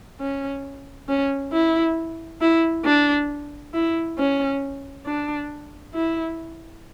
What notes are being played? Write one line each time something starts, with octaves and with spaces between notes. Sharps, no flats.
C#4
C#4
E4
E4
D4
E4
C#4
D4
E4